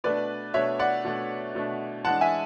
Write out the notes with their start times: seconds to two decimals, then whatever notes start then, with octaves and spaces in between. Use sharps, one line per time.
0.04 B2 A3 D4 B4 D5
0.54 B2 A3 D4 C#5 E5
0.79 D5 F#5
1.04 B2 A3 D4
1.55 B2 A3 D4
2.05 E3 G#3 D4 F#5 A5
2.21 E5 G#5